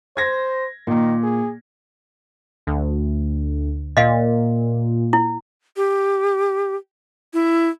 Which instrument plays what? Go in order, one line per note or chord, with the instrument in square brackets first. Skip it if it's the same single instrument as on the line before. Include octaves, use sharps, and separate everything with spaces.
[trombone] C5 [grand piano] G#6 A#6
[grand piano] A#2 [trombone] D#3
[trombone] G#4
[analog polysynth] D2
[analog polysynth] A#2 [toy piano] D#5 F5
[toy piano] E4
[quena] G4
E4